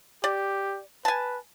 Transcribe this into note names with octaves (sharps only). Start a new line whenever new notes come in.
G4 D5
B4 G#5 A5